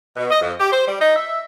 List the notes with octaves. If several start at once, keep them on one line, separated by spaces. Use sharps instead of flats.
B2
D#5
F2
G4
C5
G3
D#4
E5